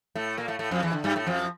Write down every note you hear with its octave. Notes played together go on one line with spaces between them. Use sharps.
A2 A3
A#2 A#3
A2 A3
A2 A3
F2 F3
E2 E3
D3
G2 G3
A2 A3
F2 F3